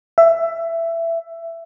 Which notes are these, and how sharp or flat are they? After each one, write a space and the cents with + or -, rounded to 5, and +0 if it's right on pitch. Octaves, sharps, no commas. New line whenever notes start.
E5 +15